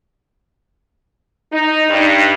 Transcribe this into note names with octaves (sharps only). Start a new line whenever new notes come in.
D#4
G2